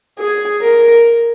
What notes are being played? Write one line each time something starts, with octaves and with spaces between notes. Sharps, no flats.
G#4
A#4